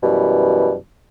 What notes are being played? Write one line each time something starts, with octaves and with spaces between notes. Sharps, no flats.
F#2 B2 E3 G3